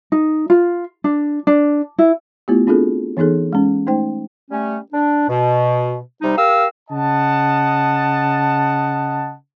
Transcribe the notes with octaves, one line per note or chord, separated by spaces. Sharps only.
D#4
F4
D4
D4
E4
A3 B3 E4 F4 G4
C4 D4 F4 F#4 G#4 A4
E3 B3 D#4 G#4 A4
G#3 C#4
A3 D#4 C5 G5
G3 A3 C#4
D4
B2
C3 G3 D#4
G4 A#4 F5 E6
C#3 D#5 F#5 A5